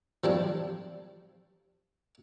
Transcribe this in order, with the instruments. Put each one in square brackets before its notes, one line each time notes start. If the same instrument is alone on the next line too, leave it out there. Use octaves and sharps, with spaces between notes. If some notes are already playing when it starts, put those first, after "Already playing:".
[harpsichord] F3 G3 D4